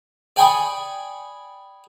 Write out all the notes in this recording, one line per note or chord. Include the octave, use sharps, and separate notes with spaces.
D5 G5 G#5 B5 C#6 D#6